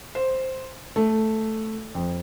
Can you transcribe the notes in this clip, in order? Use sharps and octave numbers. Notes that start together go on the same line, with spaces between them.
C5
A3
F2